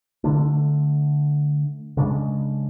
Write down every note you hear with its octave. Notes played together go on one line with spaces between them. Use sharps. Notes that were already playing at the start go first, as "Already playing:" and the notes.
D3 A3 D4
C#3 G#3 D4